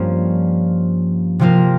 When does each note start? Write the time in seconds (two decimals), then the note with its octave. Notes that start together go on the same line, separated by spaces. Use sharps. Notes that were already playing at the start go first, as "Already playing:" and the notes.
Already playing: G2 F3 A#3 C#4 F4
1.39 C3 F3 A#3 F4 A#4